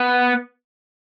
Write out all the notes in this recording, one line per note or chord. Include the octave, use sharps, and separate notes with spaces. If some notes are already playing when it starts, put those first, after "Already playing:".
Already playing: B3